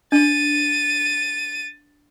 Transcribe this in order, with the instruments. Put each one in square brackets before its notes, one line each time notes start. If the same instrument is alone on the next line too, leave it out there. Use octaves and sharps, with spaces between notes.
[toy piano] D4 [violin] A6 D#7